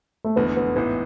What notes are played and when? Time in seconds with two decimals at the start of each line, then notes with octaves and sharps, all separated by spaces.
0.25 A3
0.36 F1 E2 D3 G#3 B3
0.57 B3
0.76 A1 G#2 E3 B3